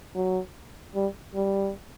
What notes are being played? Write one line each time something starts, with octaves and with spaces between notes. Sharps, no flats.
F#3
G3
G3